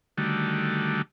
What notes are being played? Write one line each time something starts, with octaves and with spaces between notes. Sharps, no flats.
D3 D#3 G3 A3 F#4